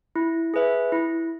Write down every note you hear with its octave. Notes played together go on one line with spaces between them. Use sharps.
E4
G#4 B4 E5
E4